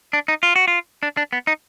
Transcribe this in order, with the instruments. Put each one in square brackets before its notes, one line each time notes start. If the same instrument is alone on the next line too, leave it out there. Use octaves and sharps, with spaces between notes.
[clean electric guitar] D4
D#4
F4
F#4
F4
D4
D4
B3
D#4